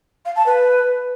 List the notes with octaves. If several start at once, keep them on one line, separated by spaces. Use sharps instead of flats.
F5
A5
B4